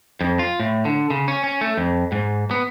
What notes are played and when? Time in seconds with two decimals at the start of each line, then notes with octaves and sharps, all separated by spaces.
0.21 F2
0.39 F4
0.60 A2
0.85 D3
1.10 C#3
1.28 C#4
1.44 C#4
1.61 A3
1.77 F2
2.12 G#2
2.51 B3